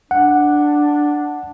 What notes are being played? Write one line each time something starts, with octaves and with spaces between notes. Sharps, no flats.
D4 F#5